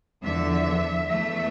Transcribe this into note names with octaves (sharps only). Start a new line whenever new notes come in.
E2 D3 F3 E5
E2 E3 A3 E5